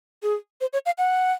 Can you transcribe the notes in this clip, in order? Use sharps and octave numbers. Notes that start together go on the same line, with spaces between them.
G#4
C5
C#5
F5
F#5